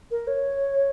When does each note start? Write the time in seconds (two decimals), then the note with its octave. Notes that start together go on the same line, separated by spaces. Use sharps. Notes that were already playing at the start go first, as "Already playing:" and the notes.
0.11 A#4
0.27 C#5